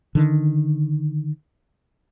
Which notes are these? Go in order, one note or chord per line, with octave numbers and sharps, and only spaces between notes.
D3 D#3